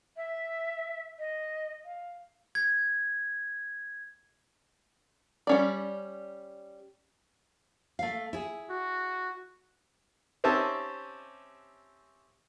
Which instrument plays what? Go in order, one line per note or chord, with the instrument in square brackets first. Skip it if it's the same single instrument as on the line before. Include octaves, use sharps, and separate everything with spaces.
[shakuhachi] E5
D#5
F5
[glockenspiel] G#6
[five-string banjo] G3 C#4 D5
[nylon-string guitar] A3 F5
E4 G#4
[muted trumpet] F#4
[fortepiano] C4 C#4 D#4 G4 E5 A5